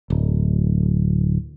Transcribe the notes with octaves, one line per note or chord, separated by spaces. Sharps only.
D1